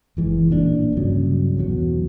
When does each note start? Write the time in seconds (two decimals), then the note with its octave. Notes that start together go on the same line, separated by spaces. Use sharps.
0.17 F#1 E3 G#3
0.48 A1 A#2 C#3 D4
0.96 C2 G2 C#3 F#3
1.57 B1 E2 B2 F#3